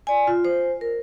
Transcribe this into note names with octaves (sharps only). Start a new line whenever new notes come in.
D5 G#5
F4
C5
A#4